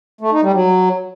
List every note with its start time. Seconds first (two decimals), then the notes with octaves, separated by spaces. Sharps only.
0.21 A3
0.32 D#4
0.42 G3
0.53 F#3